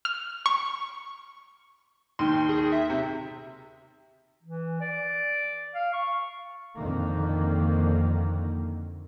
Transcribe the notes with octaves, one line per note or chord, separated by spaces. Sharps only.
F6
C#6
D#2 D#3 C6
G#4
E5
C3
E3
D5
F5
C#6
F2 A#2 D3 D#3 A#3